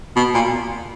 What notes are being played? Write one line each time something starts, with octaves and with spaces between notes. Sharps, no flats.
B2
A#2